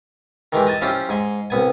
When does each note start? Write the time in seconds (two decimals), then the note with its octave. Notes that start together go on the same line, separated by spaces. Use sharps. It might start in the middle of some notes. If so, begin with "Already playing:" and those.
0.52 D#3 E3 G#3 G4
0.67 D#5 G#5 A5
0.81 F3 C#4 E4 F4 G4
1.09 G#2 G#5 C6
1.50 C2 B3 G#5